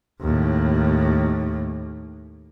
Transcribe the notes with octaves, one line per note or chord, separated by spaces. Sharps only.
D#2 A2